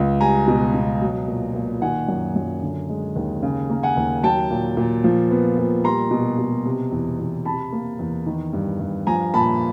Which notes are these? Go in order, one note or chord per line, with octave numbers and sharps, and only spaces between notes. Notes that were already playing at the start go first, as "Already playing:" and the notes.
Already playing: C#2
G3 G#5 A#5
B2
B2
F#3
A#2
A#2
D#3 F#5 G#5
F#2
F#2
D3
G#3
D#2
C#3
A#3
F#5 G#5
D#2
F#3 G5 A5
A#2
A#2
F3
B3
A#2
G3 A#5 C6
B2
B2
C3
E2
E2
C3 A5 B5
A#3
E2
D#3
G2
G2
F3 G#5 A#5
A#2 A5 B5